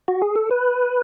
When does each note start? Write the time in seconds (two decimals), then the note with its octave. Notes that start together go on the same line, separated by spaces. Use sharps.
0.08 F#4
0.22 G#4
0.35 A4
0.51 B4